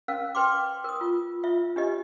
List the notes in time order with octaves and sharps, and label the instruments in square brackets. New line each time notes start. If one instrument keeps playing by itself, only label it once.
[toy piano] C#4 A#4 F5
B4 G5 C6 D6
A#4 D#6
F4
F4 E5
D4 G4 D#5